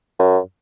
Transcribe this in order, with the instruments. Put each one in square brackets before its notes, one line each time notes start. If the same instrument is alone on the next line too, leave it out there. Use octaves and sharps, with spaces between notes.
[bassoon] F#2